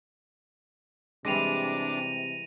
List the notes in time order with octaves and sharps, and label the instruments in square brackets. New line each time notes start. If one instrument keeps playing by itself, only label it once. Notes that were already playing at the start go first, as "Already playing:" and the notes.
[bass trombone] C3 [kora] E3 G3 G#3 [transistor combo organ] D4 [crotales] A#6 D#7 F7